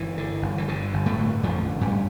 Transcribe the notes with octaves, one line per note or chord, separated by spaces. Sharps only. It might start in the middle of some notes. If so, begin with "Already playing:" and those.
Already playing: G1 E3
D3
G1
E3
G2 D3
G1
A2 A3
D3
A1 F2 F3
D3
G2 G3